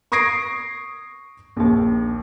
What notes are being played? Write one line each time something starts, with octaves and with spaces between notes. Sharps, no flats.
C#6 D#6 G#6 A#6 C7 D7
A#1 D#2